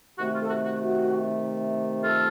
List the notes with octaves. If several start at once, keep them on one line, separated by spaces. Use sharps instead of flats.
C3 D#3 A3 F#4
F4
A4
F#4
F#4
F#4
F4 A4